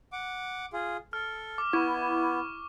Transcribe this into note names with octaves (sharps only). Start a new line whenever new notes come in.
F#5 D6
F4 G#4
A4 F6
D6
B3 E4 C#6